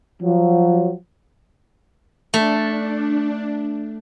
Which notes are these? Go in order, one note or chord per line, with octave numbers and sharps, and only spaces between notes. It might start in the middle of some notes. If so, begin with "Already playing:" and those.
F3 F#3
A3 D4